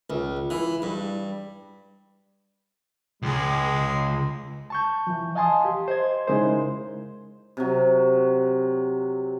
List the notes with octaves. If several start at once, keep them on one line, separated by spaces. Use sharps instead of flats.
C#2
E3
G2
C#2 G#3
A5 C#6 G6
E3 F3
D#5 F5 G#5 A5 C6 D#6
G4
C5 D#5 G#6
C#3 G#3 D#4 E4 A#4 C5
C3 F#3